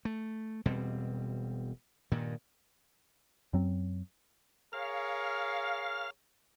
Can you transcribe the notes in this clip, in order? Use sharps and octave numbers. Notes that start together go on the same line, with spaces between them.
A3
E1 B2 G3 C4
G2 A#2 D#3
F#2 F#3 C4
G#4 A#4 C#5 F5